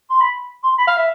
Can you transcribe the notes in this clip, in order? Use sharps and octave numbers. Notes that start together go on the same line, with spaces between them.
C6
B5
C6
B5
F5
E5